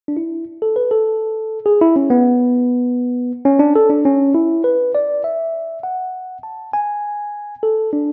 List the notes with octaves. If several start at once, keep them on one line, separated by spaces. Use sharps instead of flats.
D4
E4
A4
B4
A4
G#4
E4
C#4
B3
C#4
D4
A4
D4
C#4
E4
B4
D5
E5
F#5
A5
G#5
A4
D4